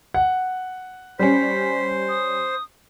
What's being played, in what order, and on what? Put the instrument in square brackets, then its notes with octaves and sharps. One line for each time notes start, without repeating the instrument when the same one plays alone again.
[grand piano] F#5
[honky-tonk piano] G3 C#4 [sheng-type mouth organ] C5 [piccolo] B6
[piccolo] D#6